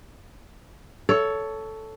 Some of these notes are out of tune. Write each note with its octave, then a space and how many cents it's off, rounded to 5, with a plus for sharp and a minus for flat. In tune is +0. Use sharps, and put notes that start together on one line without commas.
A4 +0 C#5 +15